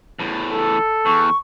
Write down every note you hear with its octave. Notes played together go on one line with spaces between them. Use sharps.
E2 A2
A4
E2 C#6